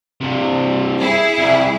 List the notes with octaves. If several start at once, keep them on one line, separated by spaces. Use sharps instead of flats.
G2 C3
E4 G#4
C2